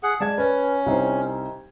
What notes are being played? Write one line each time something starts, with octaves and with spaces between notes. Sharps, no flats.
G#4 F#5
G#3 D5 A5 G#6
C#4 B4
C2 D#4 C5